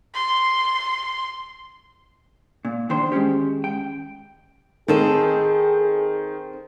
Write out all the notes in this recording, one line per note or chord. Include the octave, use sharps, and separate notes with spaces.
C6
A#2
E2 D#3 D4 C5 C6
D#3 G#3 A#3 C#4 G4
G5
D#3 C4 G#4 A4 D#5